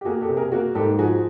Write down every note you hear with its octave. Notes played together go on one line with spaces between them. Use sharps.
G4
A#3 F#4 G#4
G4 A4
C3
G#4 A#4
A#3 F#4 G#4
G#2 G4 A4
F3 F#4 G#4